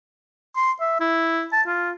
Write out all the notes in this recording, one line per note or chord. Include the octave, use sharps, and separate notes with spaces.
C6
E5
E4
A5
F4